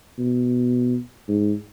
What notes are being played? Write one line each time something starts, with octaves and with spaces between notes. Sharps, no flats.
B2
G#2